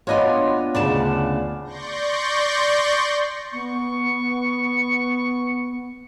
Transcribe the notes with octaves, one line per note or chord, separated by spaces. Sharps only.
B3 D4 F4 C#5 D#5 G#5
D2 C#3 D5 A5
D5 C6 C#6 G6 A#6
B3 C#6